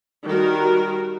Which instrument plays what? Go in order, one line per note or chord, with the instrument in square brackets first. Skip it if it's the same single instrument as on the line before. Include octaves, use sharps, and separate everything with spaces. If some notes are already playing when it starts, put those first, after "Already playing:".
[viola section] D#3 G3 F#4 A#4